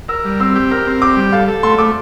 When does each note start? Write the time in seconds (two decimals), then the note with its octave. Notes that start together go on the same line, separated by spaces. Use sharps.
0.09 A#4 E6
0.25 G3
0.40 C4 E6
0.56 G4
0.71 A#4 F6
0.87 C4
1.02 G4 D6
1.17 G3
1.32 A4 F5
1.48 A4
1.63 A3 C6
1.78 A3 D6